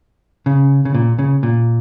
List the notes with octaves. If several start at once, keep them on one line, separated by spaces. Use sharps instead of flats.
C#3
C#3
A#2
C#3
A#2